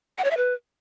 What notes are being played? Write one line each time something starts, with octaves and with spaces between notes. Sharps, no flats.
F#5
C#5
E5
B4